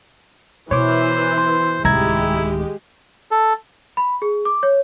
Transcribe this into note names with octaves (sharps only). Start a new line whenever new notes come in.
B2 E3 C5 C#5 D6
C6
D1 C2 D#3 G#3 E4 G4 A#5 G#6
A4
B5
G#4
D6
C#5